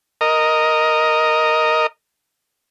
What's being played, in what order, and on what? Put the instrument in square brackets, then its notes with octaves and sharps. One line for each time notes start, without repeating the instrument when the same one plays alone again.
[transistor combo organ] A#4 D#5